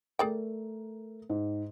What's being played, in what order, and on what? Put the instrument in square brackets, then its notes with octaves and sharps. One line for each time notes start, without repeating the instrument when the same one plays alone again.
[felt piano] A3 A#4 [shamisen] G#4 D5 G5
[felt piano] G#2